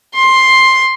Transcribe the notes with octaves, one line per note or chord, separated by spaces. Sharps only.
C6